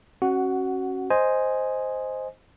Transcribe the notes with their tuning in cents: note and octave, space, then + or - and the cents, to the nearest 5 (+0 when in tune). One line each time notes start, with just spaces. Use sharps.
C#4 -30 F#4 +15 F#5 +0
C5 +0 D#5 +0 G#5 +0